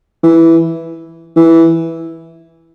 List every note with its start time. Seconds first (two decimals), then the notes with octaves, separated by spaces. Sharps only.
0.23 E3
1.36 E3